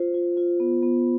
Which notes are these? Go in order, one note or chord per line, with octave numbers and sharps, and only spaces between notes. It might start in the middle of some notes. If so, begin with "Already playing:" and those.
Already playing: F4 C5
F4
F4
B3
B3